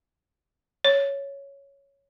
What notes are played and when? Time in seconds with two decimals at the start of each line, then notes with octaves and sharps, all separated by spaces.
0.85 C#5